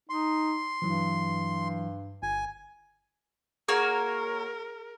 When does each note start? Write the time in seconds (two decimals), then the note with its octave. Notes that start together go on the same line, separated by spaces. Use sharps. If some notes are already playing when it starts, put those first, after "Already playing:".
0.09 D#4 C6
0.82 G2 E3 F#3 E4
2.23 G1 G#5
3.68 A#3 F#4 G#4 A#4 C#5